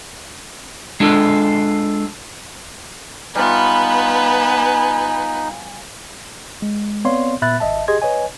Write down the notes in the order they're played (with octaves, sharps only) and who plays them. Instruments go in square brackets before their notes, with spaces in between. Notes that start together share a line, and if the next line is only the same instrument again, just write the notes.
[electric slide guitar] G#3 D4 F4 A4
[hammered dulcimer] G3 F4 [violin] B3 B4 [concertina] D#4 [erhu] G#5
[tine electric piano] G#3
B3 C4 C#5 D5 F5 C6
A#2 B3 E5 B5 F#6 A6
G#1 D#5 E5 A5
G4 G#4 D#5 C6 G#6
B4 C#5 D#5 G#5